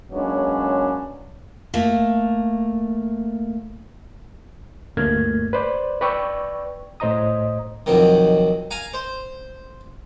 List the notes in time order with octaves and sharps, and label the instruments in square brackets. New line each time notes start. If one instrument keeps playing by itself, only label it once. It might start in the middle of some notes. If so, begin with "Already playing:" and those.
[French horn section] F#3 G#3 A#3 B3 C#4 D4
[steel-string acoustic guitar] A3 A#3
[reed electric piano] D2 G2 A3 A#3 F6 G#6
B4 C5 D5
B4 D5 G5 C#6 E6
A2 C5 D#5 A#5 D#6
[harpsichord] B1 F2 D#3
F5 G#5 A#5
C5